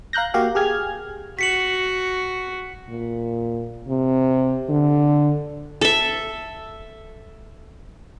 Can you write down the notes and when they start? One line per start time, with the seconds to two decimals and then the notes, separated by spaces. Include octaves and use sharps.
0.13 F5 A#5 F#6 G6 A#6
0.34 A#3 F#4 G4 F5
0.55 G4 G#4 F6 G#6
1.39 F#4 B6 C#7 F#7
2.89 A#2
3.89 C3
4.69 D3
5.81 A4 E5